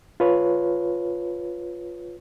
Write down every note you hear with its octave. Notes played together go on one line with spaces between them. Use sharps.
F4 B4 C#5